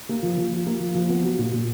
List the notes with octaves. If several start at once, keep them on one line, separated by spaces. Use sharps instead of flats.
A#3
F3
F3
F4
A#3
F3
F3
B3
F#3
A#2
A#2